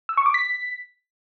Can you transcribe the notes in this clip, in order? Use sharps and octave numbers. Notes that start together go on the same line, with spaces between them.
E6
C#6
D6
B6